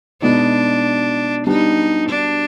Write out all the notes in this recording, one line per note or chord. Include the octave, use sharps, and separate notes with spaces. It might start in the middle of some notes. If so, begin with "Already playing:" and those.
B2 G#3 B3 D4 D#4
G3 B3 D4 D#4 G4
D4